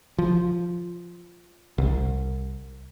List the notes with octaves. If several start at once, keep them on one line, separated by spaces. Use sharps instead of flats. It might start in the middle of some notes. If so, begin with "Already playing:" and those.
F3
C2